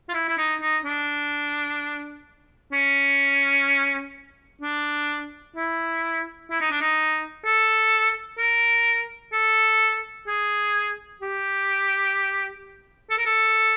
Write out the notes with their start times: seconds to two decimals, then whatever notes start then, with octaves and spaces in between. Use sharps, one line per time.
0.09 F4
0.14 E4
0.28 E4
0.38 D#4
0.61 D#4
0.84 D4
2.73 C#4
4.62 D4
5.56 E4
6.51 E4
6.61 D#4
6.71 D4
6.81 D#4
7.44 A4
8.38 A#4
9.33 A4
10.28 G#4
11.21 G4
13.10 A4
13.18 A#4
13.26 A4